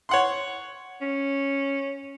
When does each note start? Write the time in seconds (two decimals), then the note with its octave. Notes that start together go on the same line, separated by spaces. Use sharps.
0.09 C#5 F#5 C6
1.01 C#4